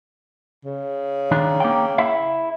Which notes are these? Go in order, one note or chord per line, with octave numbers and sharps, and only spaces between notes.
C#3
D#3 D4
A#3 G5
E4 E5